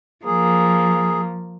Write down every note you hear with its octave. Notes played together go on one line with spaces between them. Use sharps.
F3 A#3 G#4